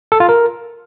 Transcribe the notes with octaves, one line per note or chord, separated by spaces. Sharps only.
A4
F4
A#4